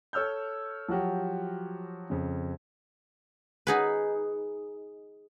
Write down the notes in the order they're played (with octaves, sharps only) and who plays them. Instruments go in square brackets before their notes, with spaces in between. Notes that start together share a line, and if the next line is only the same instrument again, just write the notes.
[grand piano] A4 C#5 E6 F6 G6
F3 F#3 F#4 G4
F2 C#3
[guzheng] D#4 G#4 B4